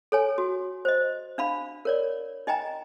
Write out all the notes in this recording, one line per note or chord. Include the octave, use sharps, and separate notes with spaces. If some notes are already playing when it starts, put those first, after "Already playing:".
A4 C#5 G#5
F#4
C5 D#5
D4 F5 B5
A#4 C#5 D5
D#4 D#5 G5 G#5 A#5